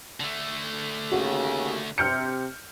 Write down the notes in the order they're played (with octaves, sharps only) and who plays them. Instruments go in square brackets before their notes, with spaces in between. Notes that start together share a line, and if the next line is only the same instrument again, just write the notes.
[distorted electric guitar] D3 A3
[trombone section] D#2 C#3 [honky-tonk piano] F#4
[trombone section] C3 [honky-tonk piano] F6 G6 C#7